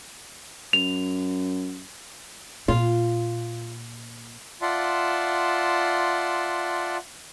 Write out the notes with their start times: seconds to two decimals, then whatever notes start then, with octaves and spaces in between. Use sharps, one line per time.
0.73 F#2 F7
2.68 A#2 F4
4.62 F4 D5 E5 F#5 A5 C6